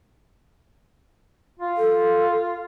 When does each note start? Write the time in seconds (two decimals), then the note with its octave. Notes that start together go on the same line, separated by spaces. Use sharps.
1.59 F4
1.77 A4